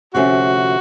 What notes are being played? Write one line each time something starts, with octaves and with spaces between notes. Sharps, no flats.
D2 C3 F3 A3 C#4 F#4